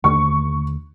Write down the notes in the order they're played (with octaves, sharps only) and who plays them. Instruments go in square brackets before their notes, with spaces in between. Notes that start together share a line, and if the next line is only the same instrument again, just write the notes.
[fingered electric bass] D#2 D3 A3 [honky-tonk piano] C#6